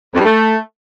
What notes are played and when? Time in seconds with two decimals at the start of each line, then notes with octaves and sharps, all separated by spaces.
0.14 F2
0.20 G2
0.25 A3